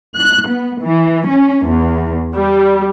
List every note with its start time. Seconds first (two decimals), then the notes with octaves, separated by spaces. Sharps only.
0.16 F#6
0.49 B3
0.82 E3
1.28 C#4
1.67 E2
2.34 G3